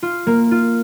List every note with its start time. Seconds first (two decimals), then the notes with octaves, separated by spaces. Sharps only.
0.03 F4
0.27 A#3
0.51 F4